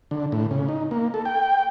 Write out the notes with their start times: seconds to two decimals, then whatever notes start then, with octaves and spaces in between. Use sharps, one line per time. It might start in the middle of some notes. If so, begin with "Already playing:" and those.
0.11 D3
0.32 A2
0.51 C#3
0.69 D#4
0.91 A#3
1.14 A4
1.25 G5